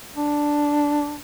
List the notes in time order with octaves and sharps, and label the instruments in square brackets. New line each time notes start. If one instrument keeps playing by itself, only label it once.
[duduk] D4